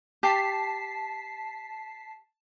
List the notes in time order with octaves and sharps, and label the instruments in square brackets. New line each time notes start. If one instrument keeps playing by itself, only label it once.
[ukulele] G4 [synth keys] A5 B6 C7